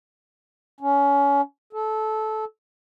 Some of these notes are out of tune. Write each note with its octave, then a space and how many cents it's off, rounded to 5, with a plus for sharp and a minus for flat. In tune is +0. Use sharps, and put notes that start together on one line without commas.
C#4 +25
A4 -20